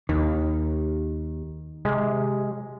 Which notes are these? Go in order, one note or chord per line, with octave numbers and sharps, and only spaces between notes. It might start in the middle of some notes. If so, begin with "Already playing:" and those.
D#2 D#3
C3 G#3